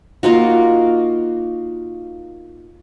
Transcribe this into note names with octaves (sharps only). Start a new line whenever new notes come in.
A#3 D#4 F4 F#4